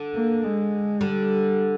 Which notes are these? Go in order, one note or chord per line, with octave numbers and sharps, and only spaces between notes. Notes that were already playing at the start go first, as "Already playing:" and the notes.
Already playing: D3
A#3
G#3
D3 G3